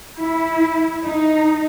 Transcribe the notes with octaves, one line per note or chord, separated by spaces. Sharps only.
E4
D#4